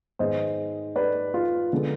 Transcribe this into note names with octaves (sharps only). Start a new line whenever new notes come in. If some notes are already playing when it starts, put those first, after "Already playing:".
G#2 D#3 G#3 B3 C5 D#5
B4 D5
F4
D3 G#3 B3